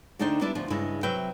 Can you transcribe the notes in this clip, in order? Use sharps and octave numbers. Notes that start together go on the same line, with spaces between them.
D2 D3 D4 D#4 C5 G5
G3 B3 D4 E4 E5
D2 F3 F4
G2 C#3 G#3 E4
C3 F#3 B4 E5 G5